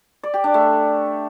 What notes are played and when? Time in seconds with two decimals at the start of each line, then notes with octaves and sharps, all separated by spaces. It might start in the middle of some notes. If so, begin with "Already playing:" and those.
0.23 D5
0.34 G4
0.44 D4
0.54 A3